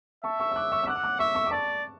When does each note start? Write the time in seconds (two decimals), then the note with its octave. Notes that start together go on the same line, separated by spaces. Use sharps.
0.24 E5 A5 C#6
0.40 C#6 E6
0.52 E6
0.56 D6 F#6
0.72 C#6 E6
0.83 E6
0.87 F#5 D6 F#6
0.96 E6
1.04 D6 F#6
1.19 E5 C#6 E6
1.35 C#6 E6
1.46 D6
1.51 D5 A5 C#6